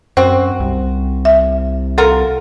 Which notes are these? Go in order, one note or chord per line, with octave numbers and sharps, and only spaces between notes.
F#2 C4 F#4 C5
C2
E5
F4 F#4 A4 A#4